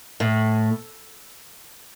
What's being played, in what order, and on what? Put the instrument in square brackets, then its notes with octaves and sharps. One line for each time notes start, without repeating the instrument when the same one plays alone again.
[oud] A2